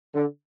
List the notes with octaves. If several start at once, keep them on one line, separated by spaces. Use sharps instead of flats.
D3